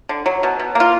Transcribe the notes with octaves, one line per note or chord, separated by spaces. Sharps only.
D3
F#3
B2
B2
A#3 F4